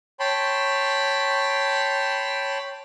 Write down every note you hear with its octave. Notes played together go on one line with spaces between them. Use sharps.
C#5 G5 A5 B5 C6